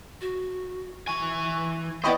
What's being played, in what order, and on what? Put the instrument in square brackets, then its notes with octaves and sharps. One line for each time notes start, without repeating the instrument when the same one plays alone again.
[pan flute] F#4
[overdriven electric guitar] E3 G#5 [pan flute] C#6
[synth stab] B3 E4 D#5 [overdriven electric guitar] C5 D5 [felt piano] G5 B5 C#6